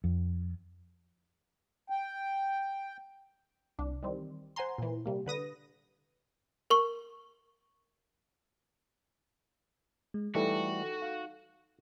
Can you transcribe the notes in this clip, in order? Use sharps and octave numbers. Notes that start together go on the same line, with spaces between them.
F2
G5
C2 D4
D#3 E3 G3 C4
C5 F#5 G#5 A#5 C6
A#2 E3
C3 G3 A#3
D3 B4 D#6 A#6
A#4 C#6
G#3
E3 G3 A3 D#4 F#4 A4
F5